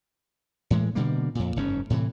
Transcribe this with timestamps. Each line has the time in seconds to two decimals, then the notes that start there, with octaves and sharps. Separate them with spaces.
0.70 A2 E3 G#3
0.95 B2 D3 G3 A#3
1.35 F2 A#2
1.56 F#1 G#2 C#4
1.90 A2 C3 D#3 E3